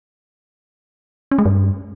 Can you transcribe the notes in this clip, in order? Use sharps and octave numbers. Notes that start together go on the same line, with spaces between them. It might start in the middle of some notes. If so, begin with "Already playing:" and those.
C#4
G#3
G2